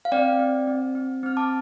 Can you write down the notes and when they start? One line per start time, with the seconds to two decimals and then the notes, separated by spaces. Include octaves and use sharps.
0.05 F5
0.12 C4 D5 G5
0.39 C4
0.67 C4
0.95 C4
1.23 C4 F6
1.37 A5 D6